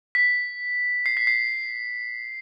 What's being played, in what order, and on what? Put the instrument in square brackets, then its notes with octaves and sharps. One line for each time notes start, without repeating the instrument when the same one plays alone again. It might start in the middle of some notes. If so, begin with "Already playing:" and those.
[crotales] B6
C7
B6
C7